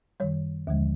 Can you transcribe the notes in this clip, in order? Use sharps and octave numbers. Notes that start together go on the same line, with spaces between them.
F#2 D#3 G3 C#5
D#2 D3 F3 G#3